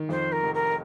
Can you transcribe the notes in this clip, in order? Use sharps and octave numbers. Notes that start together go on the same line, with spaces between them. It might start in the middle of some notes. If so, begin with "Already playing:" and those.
Already playing: D#3
F2 C5
A#4
F1
A#4